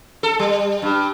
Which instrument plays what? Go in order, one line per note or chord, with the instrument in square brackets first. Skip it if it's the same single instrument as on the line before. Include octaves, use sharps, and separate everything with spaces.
[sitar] A4
G3
G2